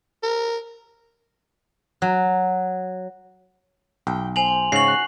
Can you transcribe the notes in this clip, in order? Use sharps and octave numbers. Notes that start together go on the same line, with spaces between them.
A#4
F#3
B1 G5
C5 G#5 F7 F#7
G#2 C#3 F#4 C#5 C7 F#7
F#6